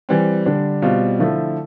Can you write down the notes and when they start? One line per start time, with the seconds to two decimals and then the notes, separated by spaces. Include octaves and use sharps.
0.09 E3 G3 C4
0.46 D3 G3 D4
0.82 B2 G3 C4 F4
1.19 D3 F3 A3 E4